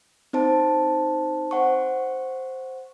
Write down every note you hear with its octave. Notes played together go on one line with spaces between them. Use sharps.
C4 D#4 C5 A5
C5 F#5 C#6